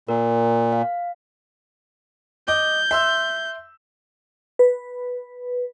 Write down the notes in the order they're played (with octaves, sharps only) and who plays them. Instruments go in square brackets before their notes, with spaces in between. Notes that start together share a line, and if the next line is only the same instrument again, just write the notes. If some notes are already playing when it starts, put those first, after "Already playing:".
[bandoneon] A#2 [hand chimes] A#4
[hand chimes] F5
[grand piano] D#5 D6 [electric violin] G6
[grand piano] E5 C6 E6
[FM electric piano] B4